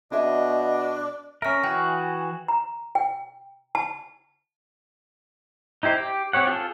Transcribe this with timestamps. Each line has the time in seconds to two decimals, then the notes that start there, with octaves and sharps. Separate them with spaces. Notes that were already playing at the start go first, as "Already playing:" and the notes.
0.12 B2 D4 F4 G#4 D#5 E5
1.42 C#4 A#4 E5 F6
1.64 E3 F#4 G#4 G5
2.48 A#5
2.95 G5
3.75 A5
5.83 D#4 E4 G4 C5
5.98 G4
6.33 C4 G4 C#5 F#5
6.47 F4 G#4 A4